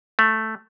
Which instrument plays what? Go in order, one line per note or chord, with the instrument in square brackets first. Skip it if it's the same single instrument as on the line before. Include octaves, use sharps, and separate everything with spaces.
[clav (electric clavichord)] A3